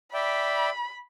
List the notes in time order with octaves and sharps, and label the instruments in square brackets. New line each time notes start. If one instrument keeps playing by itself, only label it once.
[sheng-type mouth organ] D5 E5 G5 [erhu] B5